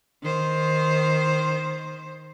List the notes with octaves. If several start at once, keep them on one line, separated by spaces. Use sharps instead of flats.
D#3 C5